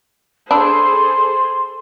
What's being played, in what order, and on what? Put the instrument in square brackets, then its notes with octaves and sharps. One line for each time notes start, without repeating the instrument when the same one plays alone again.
[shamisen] D4 [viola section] G#4 A4 C5 [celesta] B5 E6 [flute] C6